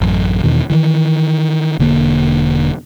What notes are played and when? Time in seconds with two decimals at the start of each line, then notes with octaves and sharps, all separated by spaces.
0.01 A1 F#2
0.44 E2 B2 D#3
0.70 D#3 E3
1.79 E1 D3 A#3